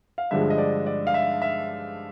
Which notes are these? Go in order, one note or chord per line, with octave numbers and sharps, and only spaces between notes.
F5
G2 D3 F3 G#3 E5
D#5
D5
D5
F5
E5
E5